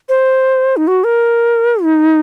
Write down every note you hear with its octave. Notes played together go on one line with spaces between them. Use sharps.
C5
D#4
F#4
A#4
D#4